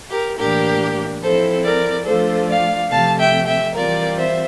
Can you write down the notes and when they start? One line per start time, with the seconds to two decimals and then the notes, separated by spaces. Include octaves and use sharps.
0.09 G4 A#4
0.38 A2 E3 A#3 D4 G4 A#4
1.21 F3 C4 E4 A4 C5
1.63 A#4 D5
2.05 F3 A3 D4 F4 A4 C5
2.48 D5 F5
2.90 C3 F3 A3 F5 A5
3.18 E5 G5
3.46 E5 G5
3.74 E3 G3 C4 F4 A#4 D5
4.16 C5 E5